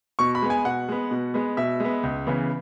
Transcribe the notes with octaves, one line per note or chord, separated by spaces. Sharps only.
B2 C#6
B5
G#3 B3
G#5
B2 F#5
G#3 B3
B2
G#3 B3
B2 E5
G#3 B3
C#2
C#3 E3 B3